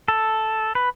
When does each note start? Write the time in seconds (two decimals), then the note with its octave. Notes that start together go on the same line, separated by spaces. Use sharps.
0.08 A4
0.75 B4